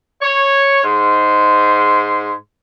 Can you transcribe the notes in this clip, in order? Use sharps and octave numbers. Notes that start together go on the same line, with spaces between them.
C#5
G#2 C6